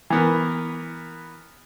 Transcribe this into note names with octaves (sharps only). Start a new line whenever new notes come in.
E3 B3 A#4